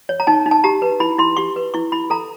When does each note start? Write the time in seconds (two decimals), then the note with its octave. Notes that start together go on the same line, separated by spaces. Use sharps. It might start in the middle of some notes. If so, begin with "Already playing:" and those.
0.09 C#5
0.20 A#5
0.27 D#4 A5
0.46 D#4
0.51 A5
0.64 G4 A#5
0.82 B4
1.00 E4 B5
1.18 E4 C6
1.37 G4 C#6
1.56 B4
1.74 E4 C#6
1.92 E4 B5
2.10 A4 A#5